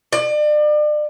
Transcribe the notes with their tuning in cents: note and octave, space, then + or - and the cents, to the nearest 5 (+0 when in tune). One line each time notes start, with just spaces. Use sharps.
D5 +35